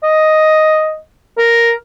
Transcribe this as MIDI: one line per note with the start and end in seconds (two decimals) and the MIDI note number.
0.03 0.97 75
1.38 1.73 70